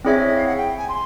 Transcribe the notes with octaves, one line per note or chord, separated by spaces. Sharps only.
C4 E4 G#4 C#5 D5 E5
D#5
F5
F#5
G5
G#5
C6